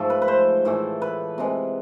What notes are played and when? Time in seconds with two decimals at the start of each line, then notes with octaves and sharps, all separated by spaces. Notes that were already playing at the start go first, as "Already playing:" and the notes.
Already playing: G#2 F3 A3 A4
0.10 B4
0.22 B4
0.28 C5
0.65 A2 E3 A3
1.02 B4
1.38 C3 E3 G#3